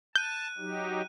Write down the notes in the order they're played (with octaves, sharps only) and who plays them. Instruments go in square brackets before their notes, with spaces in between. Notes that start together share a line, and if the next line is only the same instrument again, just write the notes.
[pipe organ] A5 [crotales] F#6 D#7 [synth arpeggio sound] G6
[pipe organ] F#3 D#4 G4